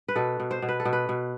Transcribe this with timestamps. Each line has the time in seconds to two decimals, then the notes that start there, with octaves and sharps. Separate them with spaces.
0.08 B4
0.16 B2 A4
0.40 B2
0.51 C5
0.62 B2
0.69 B4
0.80 A4
0.85 B2
0.93 B4
1.09 B2